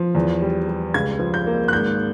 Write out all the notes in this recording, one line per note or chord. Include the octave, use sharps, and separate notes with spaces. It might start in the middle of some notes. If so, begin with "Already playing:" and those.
Already playing: F3
E2
G3
G3
C#2 G#6
F3
G6
A#3
F#6
G#1 G6